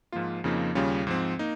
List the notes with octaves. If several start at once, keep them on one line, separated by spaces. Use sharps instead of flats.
G#2 F3 A#3 F4
F2 C#3 F3 A#3 D#4
D#2 C#3 G3 C#4 F4
G#2 F3 C4
A#3 D#4